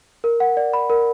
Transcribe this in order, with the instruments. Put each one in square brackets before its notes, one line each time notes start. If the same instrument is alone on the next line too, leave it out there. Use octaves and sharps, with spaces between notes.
[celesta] A#4
F#5
D5
B5
A#4